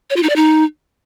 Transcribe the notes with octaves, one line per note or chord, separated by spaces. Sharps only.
C#5
F4
D#4
D5
D#4